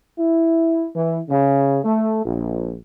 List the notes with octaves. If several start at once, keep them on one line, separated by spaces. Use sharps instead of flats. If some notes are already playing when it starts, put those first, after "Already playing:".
E4
E3
C#3
A3
A#1